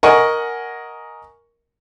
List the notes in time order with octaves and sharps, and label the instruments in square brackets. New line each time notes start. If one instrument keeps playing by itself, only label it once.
[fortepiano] A#4 D#5 F#5 G#5 C#6